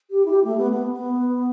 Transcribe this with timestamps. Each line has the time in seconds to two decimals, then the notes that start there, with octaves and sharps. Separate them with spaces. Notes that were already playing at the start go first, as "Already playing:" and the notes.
0.11 G4
0.25 E4
0.31 G4
0.44 A3
0.58 B3
0.72 B3
0.92 B3